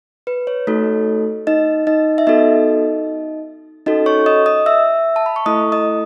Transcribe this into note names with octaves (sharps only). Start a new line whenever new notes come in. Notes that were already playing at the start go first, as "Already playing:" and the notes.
B4
C#5
A3 D#4 F#4 A4
D#4 D#5
D#4 D#5
E5
B3 D#4 F#4 A4 D#5
C#4 D#4 F#4 A4 D#5
C#5 C#6
D#5 D#6
D#5 D#6
E5 E6
A5
B5
C#6
A3 E4 A4 D#5 D#6
D#5 D#6